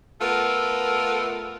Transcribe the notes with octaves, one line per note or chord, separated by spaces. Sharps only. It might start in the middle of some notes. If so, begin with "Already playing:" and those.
A3 B3 F4 A4 A#4